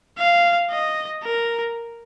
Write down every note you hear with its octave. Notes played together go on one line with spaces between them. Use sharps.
F5
D#5
A#4